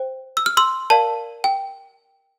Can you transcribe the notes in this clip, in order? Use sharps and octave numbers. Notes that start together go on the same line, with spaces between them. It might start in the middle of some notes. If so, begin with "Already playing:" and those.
Already playing: C5 G5
E6
F6
C6 E6
A#4 D5 F5 A5
G5